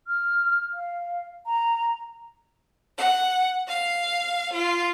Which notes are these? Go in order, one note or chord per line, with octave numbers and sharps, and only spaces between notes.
F6
F5
A#5
F#5
F5
F4